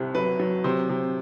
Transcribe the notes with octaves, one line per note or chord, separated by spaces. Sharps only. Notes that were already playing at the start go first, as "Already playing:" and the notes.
Already playing: C2 C3
F#3 B4
F#3
C3 C5
C3